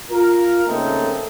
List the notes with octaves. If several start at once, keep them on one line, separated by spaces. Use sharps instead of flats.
F4 A#4
C#3 A3 A#3 C4 D#4 A4